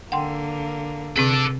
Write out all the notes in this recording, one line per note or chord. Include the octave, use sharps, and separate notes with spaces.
D3 A#3 F#5 G5 C6
C3 C4 G#4 A4 D5